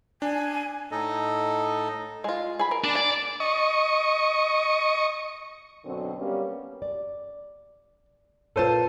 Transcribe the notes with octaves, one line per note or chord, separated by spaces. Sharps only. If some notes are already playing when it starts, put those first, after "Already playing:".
D4 G#5
A2 D#4 A4 D#5
G#3 F4
G#4 B5
A#4
D4
D5 G#5
D#5 C#6
F#2 B2 D3 F#3 C4
G3 A#3 B3 C#4
D5
A#2 F4 A4 B4 C5 A5 D#7